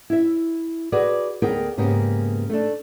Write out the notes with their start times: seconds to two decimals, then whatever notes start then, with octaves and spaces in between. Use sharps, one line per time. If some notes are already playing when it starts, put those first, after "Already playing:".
0.10 E4 E5
0.92 F#4 G#4 B4 D5
1.42 D2 B3 G#4 A#4 G5
1.77 G#2 C#3 A#3 B3 G4
2.50 A3 D4